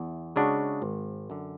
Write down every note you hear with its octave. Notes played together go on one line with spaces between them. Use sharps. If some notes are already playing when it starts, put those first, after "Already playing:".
Already playing: E2
C#3 G#3 D4 F#4
G#1
F#2 D3